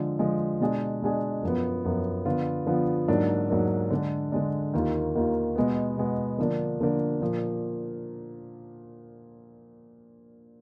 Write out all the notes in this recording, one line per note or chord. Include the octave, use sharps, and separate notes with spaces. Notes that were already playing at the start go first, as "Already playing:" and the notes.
Already playing: D3 F3 G#3
D3 F3 G#3
B2 G#3 D4 G#4
B2 G#3 D4 G#4
F#2 F3 B3
F#2 F3 B3
D3 F3 B3 F4
D3 F3 B3 F4
G#2 F#3 A#3 D4
G#2 F#3 A#3 D4
D3 G#3 D4
D3 G#3 D4
D#2 D#3 A#3 F4
D#2 D#3 A#3 F4
B2 G#3 B3
B2 G#3 B3
D3 F3 A#3 D4
D3 F3 A#3 D4
A#2 F3 A#3 D4